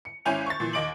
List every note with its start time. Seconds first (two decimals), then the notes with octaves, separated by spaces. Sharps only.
0.05 C#7
0.25 G#1 C#4 E4 G#5 G6 F7
0.46 C#6 A6
0.60 A#2 E3
0.73 D#2 D#5 D6 D7 F#7